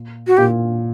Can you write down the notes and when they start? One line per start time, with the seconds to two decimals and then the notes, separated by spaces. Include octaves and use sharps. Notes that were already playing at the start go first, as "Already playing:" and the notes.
Already playing: A#2
0.27 F#4
0.37 A#2 G4